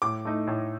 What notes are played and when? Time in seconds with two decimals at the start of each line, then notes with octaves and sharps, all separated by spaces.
0.02 A2 D6
0.25 A3 D#4
0.47 A2